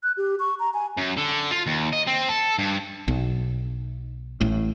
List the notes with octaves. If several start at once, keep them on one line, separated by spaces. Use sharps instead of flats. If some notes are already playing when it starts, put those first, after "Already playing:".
F#6
G4
C#6
A#5
G#5
F#2
D3
F4
D#2
D#5
C4
A4
G2
B1
A1 A2